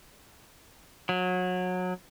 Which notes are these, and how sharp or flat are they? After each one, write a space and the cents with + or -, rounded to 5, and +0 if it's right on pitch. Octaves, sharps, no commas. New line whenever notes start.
F#3 -25